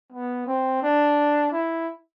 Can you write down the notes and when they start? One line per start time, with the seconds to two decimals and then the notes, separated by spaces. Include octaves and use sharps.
0.12 B3
0.47 C4
0.82 D4
1.52 E4